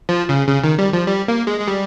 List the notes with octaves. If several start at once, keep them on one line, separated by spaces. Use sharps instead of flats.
F3
C#3
C#3
D#3
G3
F3
G3
A#3
G#3
G#3
G3